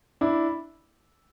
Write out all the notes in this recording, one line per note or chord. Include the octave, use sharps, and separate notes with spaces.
D4 E4